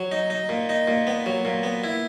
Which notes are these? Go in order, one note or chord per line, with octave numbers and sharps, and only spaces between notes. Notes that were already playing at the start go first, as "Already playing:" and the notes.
Already playing: F#3
D#4
D#4
A#2
D#4
A#2
B3
F#3
A#2
B3
E4